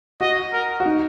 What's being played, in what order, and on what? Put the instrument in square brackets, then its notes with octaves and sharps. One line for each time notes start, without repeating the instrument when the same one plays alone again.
[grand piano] F#4 [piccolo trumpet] D#5
[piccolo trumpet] A#4
[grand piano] F#4
D#4